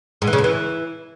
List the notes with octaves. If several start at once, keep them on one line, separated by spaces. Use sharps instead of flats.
G#2
E3
C#3
E2
E3